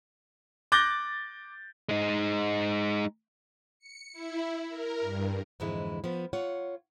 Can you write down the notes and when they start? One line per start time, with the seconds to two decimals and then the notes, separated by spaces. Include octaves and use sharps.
0.72 D6 F#6 G6 A6 A#6 G7
1.89 G#3 D#4
3.79 C#7
4.13 E4
4.68 A#4
5.00 G2
5.60 F2 G#2 D3 E3 G#3 E4
6.04 F3 B3
6.33 F4 C#5 F#5